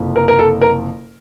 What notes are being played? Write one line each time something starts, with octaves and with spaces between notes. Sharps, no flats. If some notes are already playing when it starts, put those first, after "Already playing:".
Already playing: F#1 F2 C3
A#4
A#4
A4
A#4